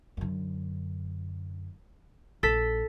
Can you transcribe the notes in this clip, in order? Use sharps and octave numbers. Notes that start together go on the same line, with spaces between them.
F#2 D3
A#1 A4 B6